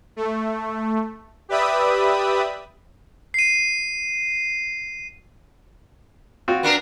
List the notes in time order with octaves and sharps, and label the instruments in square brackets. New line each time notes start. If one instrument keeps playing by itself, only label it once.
[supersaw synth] A3
G4 B4 D5 E5 B5 D#6
[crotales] C7 D#7
[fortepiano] C4 F4 F#4
[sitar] B3 D4 A#4